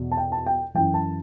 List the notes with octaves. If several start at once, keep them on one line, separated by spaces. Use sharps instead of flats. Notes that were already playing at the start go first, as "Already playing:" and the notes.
Already playing: E2 B2
A5
G5
A5
G5
F#2 E3 G5
A5